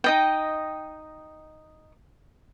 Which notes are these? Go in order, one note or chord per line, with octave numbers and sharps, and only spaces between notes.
D#4 D#5 G5